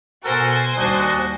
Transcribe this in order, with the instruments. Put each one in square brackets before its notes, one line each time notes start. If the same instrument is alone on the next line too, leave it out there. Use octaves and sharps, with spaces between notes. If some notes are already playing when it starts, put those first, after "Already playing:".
[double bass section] B2 [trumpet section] F#4 A4 A#4 [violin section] C5 G#5
[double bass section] D#2 G3 [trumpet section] D4 D#4 F#4